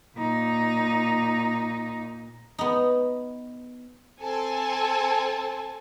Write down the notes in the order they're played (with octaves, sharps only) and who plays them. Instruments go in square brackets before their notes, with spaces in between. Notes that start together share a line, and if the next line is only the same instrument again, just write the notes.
[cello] A#2 D#4
[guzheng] B3 D#4
[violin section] C4 A4 G#5 A5